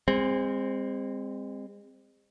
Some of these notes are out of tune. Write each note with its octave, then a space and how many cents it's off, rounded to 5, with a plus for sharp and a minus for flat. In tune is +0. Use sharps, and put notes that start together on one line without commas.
G#3 -35 C4 +0